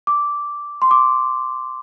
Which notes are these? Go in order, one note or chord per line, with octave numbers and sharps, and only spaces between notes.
D6
C6
D6